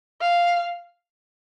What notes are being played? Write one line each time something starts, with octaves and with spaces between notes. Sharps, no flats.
F5